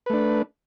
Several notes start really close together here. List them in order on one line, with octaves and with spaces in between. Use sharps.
B4 A3 D4